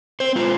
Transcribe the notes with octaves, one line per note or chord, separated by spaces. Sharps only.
C4 C5
G#3 F4